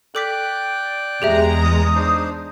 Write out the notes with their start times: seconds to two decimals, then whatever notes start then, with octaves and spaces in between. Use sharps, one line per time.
0.15 A4 D5 G5 D6 F#6 B6
1.22 E2 G#3 G4 G#4 E5 A#5
1.62 D#6
1.95 D4 D#4 C5